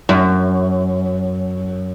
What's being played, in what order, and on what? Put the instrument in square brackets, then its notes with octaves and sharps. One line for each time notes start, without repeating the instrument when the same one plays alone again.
[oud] F#2